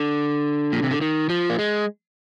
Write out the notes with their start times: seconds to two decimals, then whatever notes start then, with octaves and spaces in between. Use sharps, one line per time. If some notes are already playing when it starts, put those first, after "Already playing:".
Already playing: D3
0.72 A#2
0.83 C3
0.91 D3
1.01 D#3
1.30 F3
1.50 A#3
1.59 G#3